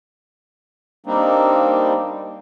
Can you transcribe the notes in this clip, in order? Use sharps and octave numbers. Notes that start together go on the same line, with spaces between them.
G3 A#3 C4 D4 D#4